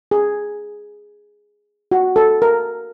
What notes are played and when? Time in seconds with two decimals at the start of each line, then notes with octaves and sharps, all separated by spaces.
0.11 G#4
1.91 F#4
2.16 A4
2.42 A#4